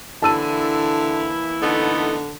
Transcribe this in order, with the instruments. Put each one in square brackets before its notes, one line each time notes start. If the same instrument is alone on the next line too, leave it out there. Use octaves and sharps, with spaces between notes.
[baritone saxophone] D3 [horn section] E3 A#3 E4 [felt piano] A5 E6 D#7
[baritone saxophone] D3 [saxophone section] A3 B3 D#4